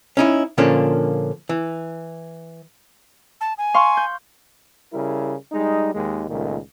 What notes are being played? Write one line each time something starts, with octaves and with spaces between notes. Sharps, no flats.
C#4 D#4 E4
A#2 D3 F3 A#3 C#4 D4
E3
A5
G#5
F5 C6 C#6
G6
C#3 G3 E4 A#4
G3 G#3 D#4
D#2 D#3 G#3
C#2 A#2 D#3 A3